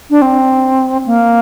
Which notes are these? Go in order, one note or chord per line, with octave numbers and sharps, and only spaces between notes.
D4
C4
A#3